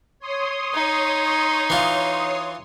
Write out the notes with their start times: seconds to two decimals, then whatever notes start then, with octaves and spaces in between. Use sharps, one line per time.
0.19 C#5 C6 D#6
0.74 D#4
1.70 E3 F4